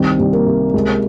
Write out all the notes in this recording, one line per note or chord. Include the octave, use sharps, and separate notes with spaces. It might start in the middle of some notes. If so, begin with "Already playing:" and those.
Already playing: C2 D#3 C4
C2
A#3
C3
C#2